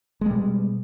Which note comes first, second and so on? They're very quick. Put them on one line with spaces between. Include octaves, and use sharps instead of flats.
G#3 G3 B2